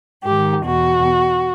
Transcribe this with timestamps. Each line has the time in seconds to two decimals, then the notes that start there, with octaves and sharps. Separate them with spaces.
0.24 G#2 D#3 G4
0.65 E2 B2 F#4